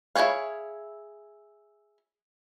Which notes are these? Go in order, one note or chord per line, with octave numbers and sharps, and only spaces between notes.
E4 F#4 G#4 C#5 F5